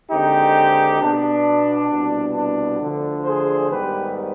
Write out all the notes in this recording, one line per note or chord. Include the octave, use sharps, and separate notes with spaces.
D#2 D3 G#3 C4 D#4 G4
B2 B3 D4
C2 B2 B3
D4
D2 D3 F3
G#4 C5
G#2 D#3 G3 B3 G4 B4